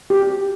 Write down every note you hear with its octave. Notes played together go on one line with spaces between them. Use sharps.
G4